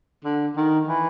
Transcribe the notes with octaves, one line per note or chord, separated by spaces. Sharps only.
D3
D#3
E3